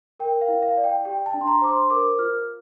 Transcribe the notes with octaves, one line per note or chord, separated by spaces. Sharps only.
A#4 G5
F5
E4
F5
D5
G5
G4 G5
A5
D4
C6
A#5
C5 D6
C6
A#4 D6
F4 F6